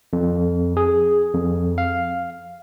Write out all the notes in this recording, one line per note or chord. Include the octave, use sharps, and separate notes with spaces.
F2
G#4
F2
F5